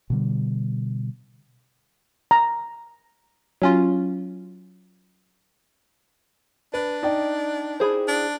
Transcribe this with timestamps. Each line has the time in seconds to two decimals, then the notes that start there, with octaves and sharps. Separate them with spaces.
0.10 B2 D3 G3
2.31 A#5
3.62 F#3 C#4 F4
6.74 D4 B4
7.03 D#4 D5 G5
7.80 E4 G#4 C5
8.08 D4